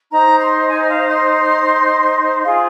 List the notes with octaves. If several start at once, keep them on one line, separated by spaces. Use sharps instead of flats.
D#4 C5 A#5
C6
G#5
F5
C6
F4 G#4 C5 F5